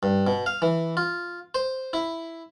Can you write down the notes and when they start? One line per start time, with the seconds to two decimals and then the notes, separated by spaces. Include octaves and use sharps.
0.03 G2
0.27 B2
0.46 F5
0.62 E3
0.97 F4
1.55 C5
1.93 E4